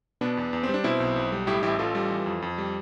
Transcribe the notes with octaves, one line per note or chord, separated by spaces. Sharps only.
B2 B3 D4
E2
E2
C4
G3
D4
B2 C4 E4
B1
B1
G3
A2 E4 G4
A1 E4 G4
A1 F4 A4
G3
E3
F2
F2
G3